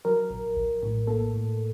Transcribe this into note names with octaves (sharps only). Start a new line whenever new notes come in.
F#3 A#4
A#1
A#1
A2
A#3 A4
A2